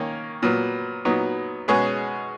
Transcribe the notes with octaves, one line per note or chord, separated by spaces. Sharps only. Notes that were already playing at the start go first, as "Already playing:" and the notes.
Already playing: D#3 A#3 C#4
A#2 F#3 B3
A#2 F#3 B3 D#4
B2 G#3 C#4 G#4 B4